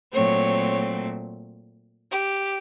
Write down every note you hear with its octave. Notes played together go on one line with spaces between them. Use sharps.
A#2 F#3 A3 C4 C#5
G4